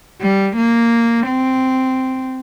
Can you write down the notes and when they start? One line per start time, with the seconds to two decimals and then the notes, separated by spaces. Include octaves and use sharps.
0.21 G3
0.57 A#3
1.27 C4